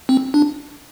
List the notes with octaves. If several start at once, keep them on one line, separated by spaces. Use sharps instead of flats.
C4
D4